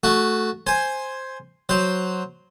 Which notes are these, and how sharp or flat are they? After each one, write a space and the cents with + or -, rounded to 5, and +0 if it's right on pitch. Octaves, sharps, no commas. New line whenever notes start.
A3 -5 F#4 +0
C5 +5 G#5 +0
F#3 +0 C5 +0